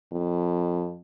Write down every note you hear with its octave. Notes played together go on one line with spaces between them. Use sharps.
F2